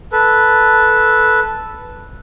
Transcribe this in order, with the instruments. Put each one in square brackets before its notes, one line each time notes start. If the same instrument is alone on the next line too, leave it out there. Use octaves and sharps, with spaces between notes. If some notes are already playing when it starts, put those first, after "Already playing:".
[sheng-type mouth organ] A4 B4